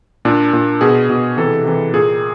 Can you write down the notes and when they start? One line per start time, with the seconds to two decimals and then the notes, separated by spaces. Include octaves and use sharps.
0.25 A#2 D4
0.53 A#2
0.81 B2 G#4
1.10 B2
1.37 C3 E3 A4
1.65 C3 E3
1.93 A#2 G#4